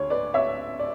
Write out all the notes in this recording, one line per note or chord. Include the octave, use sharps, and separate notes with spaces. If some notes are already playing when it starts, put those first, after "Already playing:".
Already playing: D2 C#5
B4 D5
C#5 E5
D5